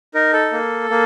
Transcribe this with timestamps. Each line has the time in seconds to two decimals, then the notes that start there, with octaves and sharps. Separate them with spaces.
0.14 D#4 A#4
0.33 A4
0.52 A#3
0.90 A#3